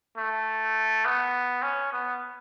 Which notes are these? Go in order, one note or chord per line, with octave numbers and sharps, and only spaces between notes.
A3
B3
C#4
B3